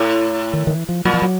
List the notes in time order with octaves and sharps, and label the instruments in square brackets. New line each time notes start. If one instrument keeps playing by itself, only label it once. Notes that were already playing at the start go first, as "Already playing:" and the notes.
Already playing: [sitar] A2
[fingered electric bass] D#3
D#3
E3
F3
[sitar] A#2 [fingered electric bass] F#3
[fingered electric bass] F3
F#3